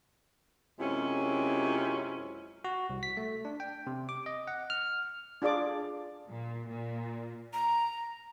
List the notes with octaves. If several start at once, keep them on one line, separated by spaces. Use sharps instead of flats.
F#2 C3 G#3 C#4 E4 F4
F#4
C2
B6
A3
D4
G5
C3
D6
D#5
F#5
F6
D4 F4 G#4 D5 D6
A#2
A#2
A#5